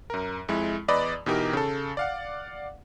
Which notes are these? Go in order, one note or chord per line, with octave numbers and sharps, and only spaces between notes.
F#2 A#4
F2 G#3 E4
E2 B4 D5 D#5 B5 D#6
B2 E3 D#4 G4 A#4
C#3 A4
D5 F5 F#5